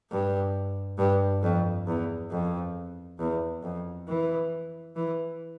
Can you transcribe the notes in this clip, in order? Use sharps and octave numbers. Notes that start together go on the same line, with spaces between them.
G2
G2
F2
E2
F2
E2
F2
E3
E3